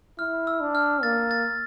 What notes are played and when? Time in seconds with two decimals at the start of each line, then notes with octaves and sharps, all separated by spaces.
0.19 E4 F6
0.47 E6
0.61 D4
0.75 F6
1.03 A#3 A6
1.31 A6